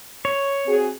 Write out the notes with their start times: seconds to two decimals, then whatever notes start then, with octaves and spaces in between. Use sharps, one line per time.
0.25 C#5
0.66 C4 F#4 G#4